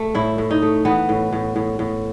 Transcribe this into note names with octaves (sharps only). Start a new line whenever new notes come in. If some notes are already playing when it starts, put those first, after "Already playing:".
Already playing: A3
A2 E4
A2
D#4
A3
E3 B3
A2
A2
A2
A2